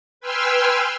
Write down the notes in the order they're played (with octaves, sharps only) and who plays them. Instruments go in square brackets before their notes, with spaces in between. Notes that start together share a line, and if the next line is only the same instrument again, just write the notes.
[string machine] B4 G5 G#5 C6 E6 F6